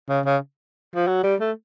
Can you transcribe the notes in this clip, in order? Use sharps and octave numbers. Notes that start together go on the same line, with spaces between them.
C#3
C#3
F3
F#3
G3
A3